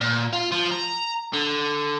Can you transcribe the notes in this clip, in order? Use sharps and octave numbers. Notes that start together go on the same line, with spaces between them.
A#2
F4
F3
A#5
D3